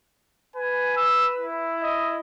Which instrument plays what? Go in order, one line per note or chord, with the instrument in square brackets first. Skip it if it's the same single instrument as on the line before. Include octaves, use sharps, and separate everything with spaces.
[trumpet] B4 [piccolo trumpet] G#5
[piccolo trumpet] E6
E4
[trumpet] D#5